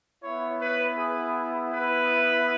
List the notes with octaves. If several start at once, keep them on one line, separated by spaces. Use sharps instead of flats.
B3 E4 C#5
B4
G#4
B4